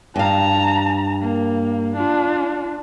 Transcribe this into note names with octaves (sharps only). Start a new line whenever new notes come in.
G2 F5 A5 A#5
A#3
D4 F4